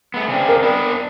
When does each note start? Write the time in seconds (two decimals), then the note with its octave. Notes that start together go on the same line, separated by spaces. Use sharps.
0.14 A3 B3
0.28 C#3 C4 D4
0.49 A#4
0.63 B3 D4 B4